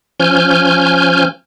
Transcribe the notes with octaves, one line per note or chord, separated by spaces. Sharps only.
F3 C#4 G#5 F6 G6